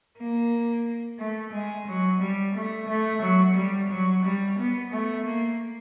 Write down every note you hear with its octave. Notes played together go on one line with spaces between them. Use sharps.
A#3
A3
G#3
F#3
G3
A3
A3
F#3
G3
F#3
G3
B3
A3
A#3